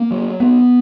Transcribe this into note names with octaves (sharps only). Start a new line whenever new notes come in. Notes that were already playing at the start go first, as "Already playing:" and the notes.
Already playing: A#3
F#3
B3